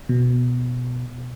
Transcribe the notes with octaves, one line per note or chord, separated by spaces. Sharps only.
B2